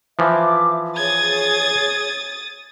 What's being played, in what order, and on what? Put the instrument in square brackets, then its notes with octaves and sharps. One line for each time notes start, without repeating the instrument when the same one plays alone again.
[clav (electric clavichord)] E3 F3 [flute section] E5 D6
[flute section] G#4 C#5 [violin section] D#6 A6 [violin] G#6